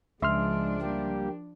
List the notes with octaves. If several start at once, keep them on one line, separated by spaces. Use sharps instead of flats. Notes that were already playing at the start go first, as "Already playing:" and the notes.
C#2 F3 G#3 D4 E5 C6 F6
G3 A#3 G4